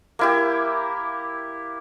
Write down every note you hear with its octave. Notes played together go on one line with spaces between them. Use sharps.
A#3 E4 G4